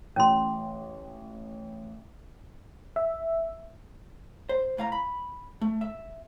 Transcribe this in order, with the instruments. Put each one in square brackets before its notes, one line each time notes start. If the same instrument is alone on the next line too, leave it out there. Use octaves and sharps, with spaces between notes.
[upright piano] A1 [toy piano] C#4 C6
[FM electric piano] E5
[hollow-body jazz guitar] C5
A2 F5 A#5
B5
A3
E5